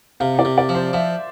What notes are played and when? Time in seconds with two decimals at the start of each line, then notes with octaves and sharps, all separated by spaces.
0.20 C3 F5
0.39 D5
0.45 C3
0.58 D5
0.69 F3
0.75 C5
0.93 F3 E5